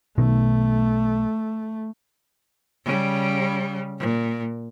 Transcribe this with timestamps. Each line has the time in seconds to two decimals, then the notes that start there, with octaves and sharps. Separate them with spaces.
0.18 B1 B2 D#3 A3
2.85 C#3 G3
3.99 A#2